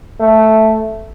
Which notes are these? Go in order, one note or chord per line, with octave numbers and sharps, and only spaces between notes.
A3